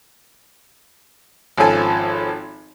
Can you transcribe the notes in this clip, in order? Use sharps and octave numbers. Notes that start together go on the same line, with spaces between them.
G#1 F3 C#4 A4 G#5